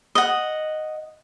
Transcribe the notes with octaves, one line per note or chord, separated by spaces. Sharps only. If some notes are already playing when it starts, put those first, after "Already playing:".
D#5 F#5